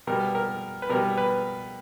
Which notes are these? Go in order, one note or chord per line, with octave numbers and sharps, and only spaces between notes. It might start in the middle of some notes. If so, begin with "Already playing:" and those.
B2 G3 B3 A#4
A#4
B4
B2 G3 B3 A#4
B4